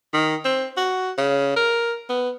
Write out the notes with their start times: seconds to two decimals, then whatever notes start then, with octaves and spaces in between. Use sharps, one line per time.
0.13 D#3
0.45 C4
0.77 F#4
1.18 C#3
1.56 A#4
2.09 B3